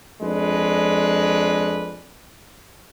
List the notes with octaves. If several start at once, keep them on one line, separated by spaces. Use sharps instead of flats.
F2 G#3 D4 B4